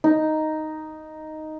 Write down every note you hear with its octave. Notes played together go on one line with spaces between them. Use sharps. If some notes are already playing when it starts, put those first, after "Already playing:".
D#4